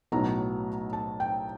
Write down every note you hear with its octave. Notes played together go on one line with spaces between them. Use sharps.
B1 A2 F#3 B3 A#5
A5
G5